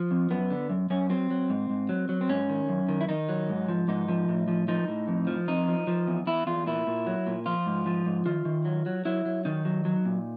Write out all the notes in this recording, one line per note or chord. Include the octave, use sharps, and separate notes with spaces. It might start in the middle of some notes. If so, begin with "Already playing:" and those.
Already playing: F3
F2
F#2 B3
D3
F#2
F#2 C#4
F#3 C4
F#3
G#2
G#2
F#3
F#3
C4
G#2 C#4
D#3
F#2
D#3
E4
D#3 D#4
F#3
G#2
F3
G#2 D#4
F3
A2
F3
F3 D#4
A2
F2
F3
F2 D#4
F3
F3
E2
E2 E4
E2 F4
A#2 E4
A#2
F#3
A#2
F3 F4
G#2
F3
G#2
D#3 F4
D#3
F#3
F#3
F#3 E4
F#3
D#3 D#4
F#3
F#3
A#2